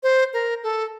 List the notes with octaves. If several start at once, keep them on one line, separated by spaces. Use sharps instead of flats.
C5
A#4
A4